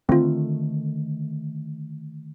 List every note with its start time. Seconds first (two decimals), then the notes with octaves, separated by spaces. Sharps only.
0.09 D3 D#3 A3 C4 F4